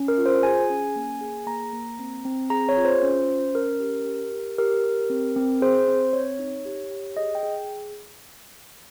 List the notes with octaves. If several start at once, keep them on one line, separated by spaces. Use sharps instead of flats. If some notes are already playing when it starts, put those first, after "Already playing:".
Already playing: C#4
A#4
F4
C5
G#4 G#5
C#4
A#3
G#4
A#3 A#5
A#3
C4
C4
G#4 A#5
C#5
F4
C5
C#4
C#4
C#4 A#4
G4
G4
G4
G4 A#4
G4
C4
C4
G#4 C5
C4
C4 C#5
D#4
G4
G4
G#4 D#5
G5
G#4